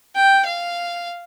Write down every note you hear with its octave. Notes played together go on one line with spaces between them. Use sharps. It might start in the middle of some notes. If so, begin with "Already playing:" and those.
G5
F5